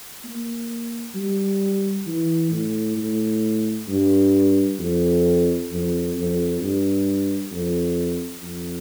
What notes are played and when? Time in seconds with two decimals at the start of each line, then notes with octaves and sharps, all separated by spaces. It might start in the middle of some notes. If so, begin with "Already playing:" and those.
0.24 A#3
1.15 G3
2.07 E3
2.51 A2
2.97 A2
3.88 G2
4.79 F2
5.70 F2
6.16 F2
6.61 G2
7.51 F2
8.42 F2